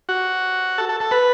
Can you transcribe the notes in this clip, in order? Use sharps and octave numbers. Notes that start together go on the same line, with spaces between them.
F#4
A4
A4
A4
B4